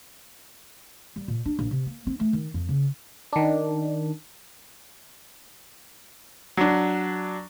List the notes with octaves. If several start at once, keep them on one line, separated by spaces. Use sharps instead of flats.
G3
A#2
D4
A#1
C3
A#3
C4
A3
D#3
F2
C#3
D#3 D4
F#3 D4